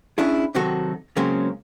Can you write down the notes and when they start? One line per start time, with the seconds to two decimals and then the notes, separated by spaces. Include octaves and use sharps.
0.18 C#4 D4 E4 G#4
0.55 C3 D#3 F#3 C4 F#4 A4
1.16 C#3 F#3 G#3 A#3 C4 C#4